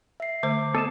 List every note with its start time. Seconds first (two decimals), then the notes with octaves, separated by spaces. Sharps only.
0.20 E5 C7
0.43 D3 A3 C5 D6
0.75 B3 A4 D#5 A5